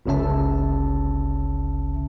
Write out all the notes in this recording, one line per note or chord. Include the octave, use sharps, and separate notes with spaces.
G1 C#2 C#3 C#4 E5 A5